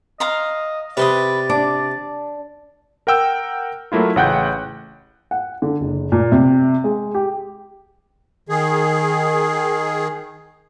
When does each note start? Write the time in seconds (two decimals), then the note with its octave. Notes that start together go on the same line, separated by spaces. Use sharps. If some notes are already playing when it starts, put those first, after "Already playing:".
0.20 D#5 F5 A#5 C6
0.97 C3 B4 D5 C6 D#6
1.50 D4 D6
3.07 A#4 F#5 G5 E6
3.92 F#3 A3 A#3 E4 F4
4.16 A1 C#3 F#5 G5 F#6 G6
5.31 F#5
5.62 D3
5.81 F#1
6.12 A#2
6.32 C3
6.84 G#3
7.15 G4
8.49 D#3 G#4